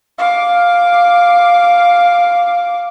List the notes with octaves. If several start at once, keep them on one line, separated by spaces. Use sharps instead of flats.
F5 D6